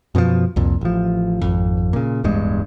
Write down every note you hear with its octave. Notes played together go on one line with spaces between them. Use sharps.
F#2 B2 D3 F3
C2 F2 A#2
A1 F3
G#1 F2
A#2 C#3
D1 E2 G2 G#3